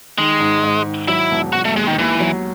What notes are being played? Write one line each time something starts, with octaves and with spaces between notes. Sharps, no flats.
D#3 G#3
G#2
G#2
D#3
F#3 E4
E1
E1 F#4
A3
D#2 G#3
D#3
D#2 E3
F#3